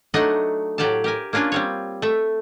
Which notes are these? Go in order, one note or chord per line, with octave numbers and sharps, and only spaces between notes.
F#3 A3 D4 D#4 D#5 F#5
A2 F#3 G4 D5 F5 A5
G4 A#4 G#5
A#3 C#4 D4 F4 G#5
G3 C4 C#5
A3 E5